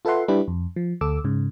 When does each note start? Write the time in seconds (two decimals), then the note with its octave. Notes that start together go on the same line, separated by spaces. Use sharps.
0.05 F4 A4 B4 E5 F#5 C6
0.28 G3 D4 E4 G4 B4
0.48 F2
0.76 F3
1.01 D2 A4 D6 E6
1.24 G#2 C#3